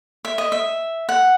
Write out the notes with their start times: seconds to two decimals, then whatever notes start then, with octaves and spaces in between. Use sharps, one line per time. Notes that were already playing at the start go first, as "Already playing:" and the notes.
0.25 E5
0.38 D#5
0.52 E5
1.09 F#5